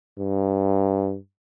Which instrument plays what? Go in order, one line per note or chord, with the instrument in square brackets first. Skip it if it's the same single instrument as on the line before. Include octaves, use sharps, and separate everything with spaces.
[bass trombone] G2